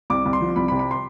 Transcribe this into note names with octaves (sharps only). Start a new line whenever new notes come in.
C2 D6
C2
C6
F3
C2 B5
B5
C3
B5
C6